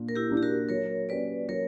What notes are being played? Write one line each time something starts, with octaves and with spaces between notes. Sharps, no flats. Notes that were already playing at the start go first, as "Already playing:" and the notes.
Already playing: A#2 A#3 D4
A#4
E4 G4
A#3 D4
G4
F#4 A#4
F#3 A#4 C#5
A#3 C#4 G4 B4 C#5 D5
F#3 A#4 C#5